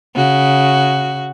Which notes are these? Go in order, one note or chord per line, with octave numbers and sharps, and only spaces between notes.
C#3 F#4